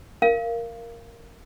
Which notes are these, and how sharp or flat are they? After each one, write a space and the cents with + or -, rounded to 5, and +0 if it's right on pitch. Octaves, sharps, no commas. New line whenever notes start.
A#4 +0 F5 -15